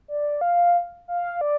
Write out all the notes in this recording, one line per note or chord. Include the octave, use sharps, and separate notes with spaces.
D5
F5
F5
D5